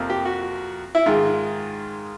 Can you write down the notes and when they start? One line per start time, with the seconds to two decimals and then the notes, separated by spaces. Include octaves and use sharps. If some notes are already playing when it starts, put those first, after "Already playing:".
Already playing: F2 C3 F3 A#3
0.10 G4
0.25 F#4
0.95 E4
1.06 G#2 D#3 G#3 F4